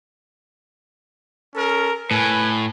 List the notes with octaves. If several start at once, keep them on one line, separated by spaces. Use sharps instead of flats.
C#4 A4 A#4
A2 B4 G#5